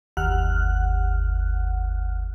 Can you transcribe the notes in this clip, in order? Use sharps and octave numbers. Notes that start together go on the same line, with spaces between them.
G1 D#2 F#5 F6 F#6